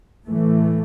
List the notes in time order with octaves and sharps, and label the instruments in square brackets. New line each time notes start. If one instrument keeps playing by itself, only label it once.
[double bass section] A2 E3 A3